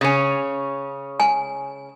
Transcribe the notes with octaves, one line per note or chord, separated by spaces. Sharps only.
C#3 C#4
G#5